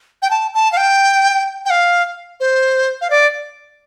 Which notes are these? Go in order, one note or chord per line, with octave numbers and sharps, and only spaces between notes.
G5
A5
A5
F5
G5
G5
F5
C5
F5
D5